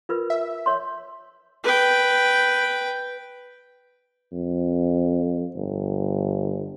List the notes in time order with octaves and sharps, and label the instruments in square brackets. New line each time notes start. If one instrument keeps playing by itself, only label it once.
[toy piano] F4 A#4 B4
[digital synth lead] E5
[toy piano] C#5 C6
[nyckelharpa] B4 G5
[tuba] F2
G1